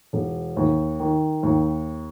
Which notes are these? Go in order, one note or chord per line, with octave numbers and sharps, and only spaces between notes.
E1
D#2
D#3
D#2